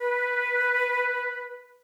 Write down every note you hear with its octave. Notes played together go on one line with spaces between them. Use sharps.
B4